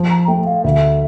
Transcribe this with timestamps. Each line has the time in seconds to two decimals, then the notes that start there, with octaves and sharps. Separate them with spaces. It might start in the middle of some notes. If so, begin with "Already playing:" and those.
Already playing: F3
0.10 A#5
0.28 A3 G5
0.46 F5
0.64 D2 E5